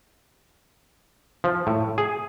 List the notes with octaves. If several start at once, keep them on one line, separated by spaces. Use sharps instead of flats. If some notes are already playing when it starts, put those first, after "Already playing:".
F3
A2
G#4